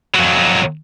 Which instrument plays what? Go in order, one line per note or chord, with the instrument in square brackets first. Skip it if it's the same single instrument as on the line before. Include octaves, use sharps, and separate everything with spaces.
[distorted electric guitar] F2 F#3